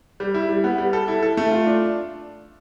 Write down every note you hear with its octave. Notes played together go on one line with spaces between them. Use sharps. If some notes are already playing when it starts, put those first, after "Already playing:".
G3
E4
G3
B3
G3
A4
E4
A4
A3
F4
D4